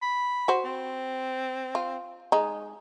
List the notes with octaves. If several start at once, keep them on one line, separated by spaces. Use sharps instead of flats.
B5
F#4 C5
C4
F4
G#3 D#4